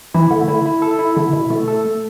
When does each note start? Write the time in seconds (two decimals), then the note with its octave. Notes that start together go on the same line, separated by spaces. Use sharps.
0.14 E3 E4
0.31 D3 A3
0.48 D3 E4
0.66 E4
0.82 A4
0.99 E4
1.16 D3 E4
1.33 B2 E4
1.50 B2 A3
1.68 A4
1.85 A3